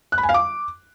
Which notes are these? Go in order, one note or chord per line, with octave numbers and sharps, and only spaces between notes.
F#6
B5
G#5
F5
D6